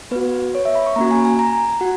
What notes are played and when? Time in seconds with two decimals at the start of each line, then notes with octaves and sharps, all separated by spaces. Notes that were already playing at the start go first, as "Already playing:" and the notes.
0.11 B3 F#4 B4
0.55 C#5
0.65 E5
0.75 B5
0.86 C#6
0.96 A#3 C#4 F#4 A#5
1.11 G#5
1.25 G#5
1.39 A#5
1.81 F#4 F#5